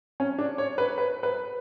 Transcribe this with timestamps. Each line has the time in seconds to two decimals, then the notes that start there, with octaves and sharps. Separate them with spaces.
0.20 C#4
0.38 D4
0.58 C#5
0.78 B4
0.98 B4
1.23 B4